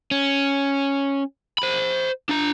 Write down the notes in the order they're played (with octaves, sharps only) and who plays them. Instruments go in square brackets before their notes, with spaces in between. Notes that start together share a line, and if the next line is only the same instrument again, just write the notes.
[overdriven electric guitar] C#4
C5 B5
D4 A#5